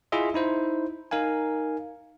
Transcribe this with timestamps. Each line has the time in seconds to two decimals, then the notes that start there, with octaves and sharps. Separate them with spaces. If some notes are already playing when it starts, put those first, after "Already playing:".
0.12 E4 F4 G#4 D#5 E5
0.34 D#4 E4 C5
1.11 D#4 A#4 F5 G#5